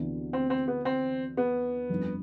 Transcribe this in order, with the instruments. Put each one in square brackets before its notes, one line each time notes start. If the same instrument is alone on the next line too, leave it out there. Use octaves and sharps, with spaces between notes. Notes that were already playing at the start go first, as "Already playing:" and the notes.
Already playing: [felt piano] D2 C3 E3 B3 D4
[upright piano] C4
C4
B3
C4
B3
[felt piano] G1 F2 D3